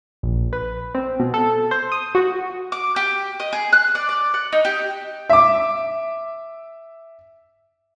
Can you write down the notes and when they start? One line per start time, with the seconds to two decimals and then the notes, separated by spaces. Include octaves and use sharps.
0.23 A#1
0.53 B4
0.95 C4
1.20 B2
1.34 A4
1.71 C5
1.92 D#6
2.15 F#4
2.72 D6
2.96 G4
3.40 D#5
3.53 G#4
3.73 F#6
3.95 D5
4.09 D5
4.34 F#5
4.53 D#4
4.65 G4
5.29 E5 D6